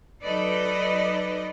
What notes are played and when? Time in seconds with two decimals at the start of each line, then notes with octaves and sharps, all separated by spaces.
0.24 F#3 D#4 A4 B4 D5 D#5